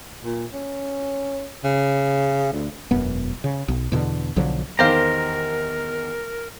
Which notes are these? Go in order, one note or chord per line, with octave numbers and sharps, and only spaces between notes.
A#2
C#4
C#3
D2
E1 F#2 B3
C#3
B1
E2 B2 D3
B1 D3 F3 F#3
E2 D#3 G4 A#4 C5 F5 A#5